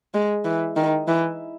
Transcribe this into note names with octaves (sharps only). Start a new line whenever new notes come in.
G#3
E3
D#3
E3